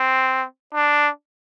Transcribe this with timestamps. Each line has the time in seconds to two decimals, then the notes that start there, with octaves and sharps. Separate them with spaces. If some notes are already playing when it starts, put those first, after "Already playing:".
Already playing: C4
0.74 D4